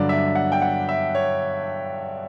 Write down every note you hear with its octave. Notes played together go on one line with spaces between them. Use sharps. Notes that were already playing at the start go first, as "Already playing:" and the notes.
Already playing: G2 D3 F#3 D5
E5
F#5
G5
F#5
E5
C#5